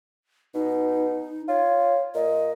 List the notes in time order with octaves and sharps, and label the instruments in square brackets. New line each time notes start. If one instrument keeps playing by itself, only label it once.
[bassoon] B2 [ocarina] D#4
[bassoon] F4 [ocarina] C#5
[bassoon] A#2 [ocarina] D#5